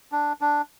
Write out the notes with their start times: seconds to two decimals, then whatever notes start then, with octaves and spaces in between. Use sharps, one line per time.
0.12 D4
0.41 D4